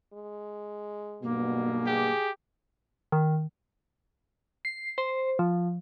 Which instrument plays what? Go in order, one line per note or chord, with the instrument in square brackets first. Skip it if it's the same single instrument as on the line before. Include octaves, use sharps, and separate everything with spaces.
[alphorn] G#3
[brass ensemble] B1 G2 B2 [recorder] A#3
[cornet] G4 [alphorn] G#4
[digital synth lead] D#3
C7
C5
F3